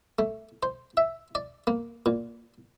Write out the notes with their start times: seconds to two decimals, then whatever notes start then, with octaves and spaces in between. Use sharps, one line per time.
0.19 A3
0.63 C5
0.97 E5
1.35 D5
1.67 A#3
2.06 A#2